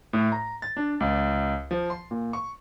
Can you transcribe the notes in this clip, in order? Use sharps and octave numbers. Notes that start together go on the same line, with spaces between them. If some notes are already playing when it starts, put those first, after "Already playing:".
A2
A#5
A6
D4
C#2
F3
C6
A#2
C#6